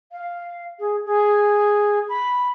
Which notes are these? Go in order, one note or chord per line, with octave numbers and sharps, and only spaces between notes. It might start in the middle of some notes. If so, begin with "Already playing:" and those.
F5
G#4
G#4
B5